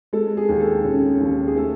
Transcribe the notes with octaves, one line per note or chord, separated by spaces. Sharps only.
G#3 A4
G#4
D#2
A4
C#3
D#2
G#4
A3 A4